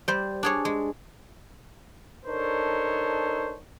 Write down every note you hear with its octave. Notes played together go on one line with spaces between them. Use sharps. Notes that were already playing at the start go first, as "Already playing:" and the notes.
G3 C5
D4 G#4 C#5
G#3
D4 D#4 A4 A#4 C5 C#5